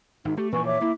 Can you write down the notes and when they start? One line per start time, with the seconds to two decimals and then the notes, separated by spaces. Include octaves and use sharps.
0.25 G#1 D#4
0.37 A3 G4
0.52 A#2 E3 F3 B4 G#5 C#6
0.65 C#5 E5 D6
0.81 A#3 E4